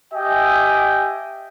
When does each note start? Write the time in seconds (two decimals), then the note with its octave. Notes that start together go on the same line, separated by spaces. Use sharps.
0.13 G4 D#5 E5 G5 G#5